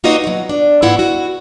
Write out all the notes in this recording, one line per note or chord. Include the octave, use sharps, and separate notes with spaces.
A#3 D#4 F4 F#4 B4 D#5
B2 F#3
D4
G#2 E3 B3 E4 F4 F#5
F#4